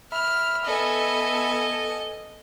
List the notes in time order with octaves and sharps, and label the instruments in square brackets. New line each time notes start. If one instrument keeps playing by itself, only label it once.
[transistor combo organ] E5 B5 [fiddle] F6
[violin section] B3 A4 G#5 [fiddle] D#5